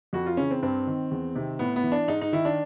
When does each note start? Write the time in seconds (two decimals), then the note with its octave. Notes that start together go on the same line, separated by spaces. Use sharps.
0.13 F2 F#4
0.26 F4
0.37 C#3 E3 C#4
0.51 C4
0.62 G2 C4
0.87 D#3
1.11 E2
1.35 C3 D#3
1.59 A2 B3
1.76 B3
1.84 E3
1.92 D4
2.08 G#2 D#4
2.21 D#4
2.33 D#3 E4
2.45 D4